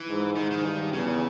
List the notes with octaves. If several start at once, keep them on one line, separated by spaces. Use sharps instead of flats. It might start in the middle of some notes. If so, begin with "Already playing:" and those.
Already playing: E3
G#2
G#2 D#3
D#3
G2
E2 C#3